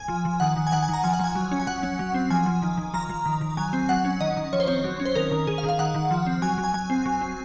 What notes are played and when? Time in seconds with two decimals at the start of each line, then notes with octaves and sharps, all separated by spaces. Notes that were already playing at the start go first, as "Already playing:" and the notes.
Already playing: G#5
0.08 F3
0.25 F3
0.40 D#3 F#5
0.56 D#3
0.67 G#5
0.72 D#3 F#5
0.82 G#5
0.88 D#3 A#5
1.04 F3 G#5
1.14 F#5
1.19 F3 G#5
1.35 F#3
1.51 C#4
1.60 G#5
1.67 F#3 F#5
1.83 C#4
1.99 F#3
2.14 C4
2.30 F3 G#5
2.46 F3
2.62 D#3
2.77 D#3
2.94 F3 A#5
3.09 F3
3.25 D#3
3.41 D#3
3.57 F#3 G#5
3.73 C4
3.89 F#3 F#5
4.05 C#4
4.20 D#3 D#5
4.37 D#3
4.53 F3 C#5
4.60 C5
4.67 C4 C#5
4.84 F#3
5.00 C#4
5.05 C5
5.15 D#3 A#4
5.31 D#3
5.47 D#3 G#4
5.58 F5
5.63 D#3
5.69 F5
5.79 D#3 F#5
5.95 D#3
6.11 F3
6.26 C4
6.42 F#3 G#5
6.58 F#3
6.64 G#5
6.74 F#3 G#5
6.90 C4
7.06 F#3
7.21 C4